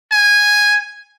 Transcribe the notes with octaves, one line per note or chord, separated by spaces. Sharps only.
G#5